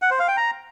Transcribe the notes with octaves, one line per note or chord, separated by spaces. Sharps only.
F#5
C5
F5
G5
A#5